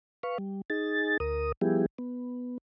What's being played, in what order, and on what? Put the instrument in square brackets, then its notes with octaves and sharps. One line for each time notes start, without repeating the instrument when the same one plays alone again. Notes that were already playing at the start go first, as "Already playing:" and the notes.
[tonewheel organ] B4 F5 C#6
G3
D#4 G#4 A6
D2 A#4 D#6
F3 G3 B3 E4 G4 G#4
B3